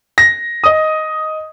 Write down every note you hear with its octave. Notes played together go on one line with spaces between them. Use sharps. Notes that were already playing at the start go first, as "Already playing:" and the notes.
A#6
D#5 D#6